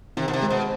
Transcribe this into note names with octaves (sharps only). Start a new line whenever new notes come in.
C3 D#3
B2
C3
G#3
B2